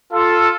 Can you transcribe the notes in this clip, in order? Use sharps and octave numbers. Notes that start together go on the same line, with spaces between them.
F4 A4